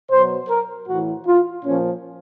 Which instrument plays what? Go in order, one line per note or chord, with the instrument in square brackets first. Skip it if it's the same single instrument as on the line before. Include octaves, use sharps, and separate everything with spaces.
[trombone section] B2 F#3 C5
A#4
A2 E3 F#4
F4
A#2 F3 C#4